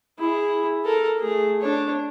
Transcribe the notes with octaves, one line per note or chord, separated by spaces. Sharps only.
E4 G#4
A4 A#4
A3 G#4
D4 C#5